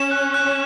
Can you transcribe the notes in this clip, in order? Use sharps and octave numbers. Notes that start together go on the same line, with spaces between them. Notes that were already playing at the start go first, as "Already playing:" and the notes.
Already playing: C#4 E7
F#6
F#6